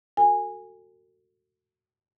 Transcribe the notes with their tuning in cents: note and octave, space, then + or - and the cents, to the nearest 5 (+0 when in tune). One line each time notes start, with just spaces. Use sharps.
F#4 +0 A4 +35 G#5 -15